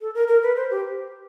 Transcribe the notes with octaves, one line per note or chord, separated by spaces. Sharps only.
A4
A#4
A#4
B4
C5
G4